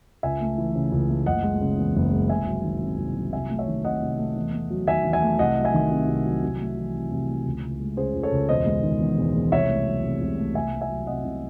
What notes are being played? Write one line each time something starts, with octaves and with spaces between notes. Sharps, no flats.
C#2 E5 G#5
A3
E3
C#3
C#2
A3
F#1 D#5 F#5
G#3
C#3
E2
F#1
G#3
C2 E5 G#5
F#3
D#3
C3
C2
F#3
C2 E5 G#5
A3
C#5 E5
D#3
C3 D#5 F#5
C2
A3
E2
A3
F#3
D#3 E5 G#5
E2
E5 G#5
A3
C2 D#5 F#5
F#3
E5 G#5
D#3
C3
C2
F#3
C2
A3
E3
C3
C2
A3
C#2
C#2
G#3
C#3 G#4 C5
C#2
A4 C#5
C#2
E1 C5 D#5
G#3
D#3
E2
E1
G#3
C2 C#5 E5
A3
F#3
C3
C2
A3
C2 E5 G#5
A3
E5 G#5
F#3
C3 D#5 F#5
C2